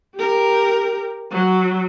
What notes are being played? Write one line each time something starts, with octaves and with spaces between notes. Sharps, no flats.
G4 A#4
F#3